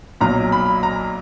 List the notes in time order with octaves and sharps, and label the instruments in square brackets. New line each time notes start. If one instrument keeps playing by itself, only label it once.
[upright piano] B1 A#2 F#3 A#5
B5
A#5